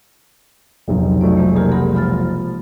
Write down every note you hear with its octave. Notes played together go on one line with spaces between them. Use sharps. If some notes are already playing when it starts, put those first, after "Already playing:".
F1 B1 D#4
F3 F#3 A3 D5
E3 G#3 A#3
C3 A#3 G4 G#4 A#4
G#3 A#4 F#5 B5
F3 B5 F6 A6